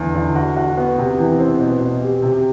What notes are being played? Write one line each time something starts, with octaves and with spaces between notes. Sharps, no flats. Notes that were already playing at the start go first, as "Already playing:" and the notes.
Already playing: E2 D3
D3
F#4
F#4
B3
C3
E3
C4
B2
B2
G4
C3